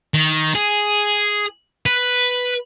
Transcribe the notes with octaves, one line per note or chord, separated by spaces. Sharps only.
D#3
G#4
B4